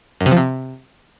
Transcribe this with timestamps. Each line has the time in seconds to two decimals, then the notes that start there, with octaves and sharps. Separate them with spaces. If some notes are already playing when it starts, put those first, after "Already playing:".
0.21 F#2
0.26 C3
0.31 F3
0.37 C3